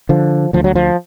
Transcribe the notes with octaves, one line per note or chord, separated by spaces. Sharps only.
D3 F3
D2 F3
F#3
F3